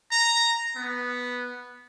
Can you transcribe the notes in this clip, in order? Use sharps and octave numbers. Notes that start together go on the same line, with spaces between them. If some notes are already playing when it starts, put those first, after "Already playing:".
A#5
B3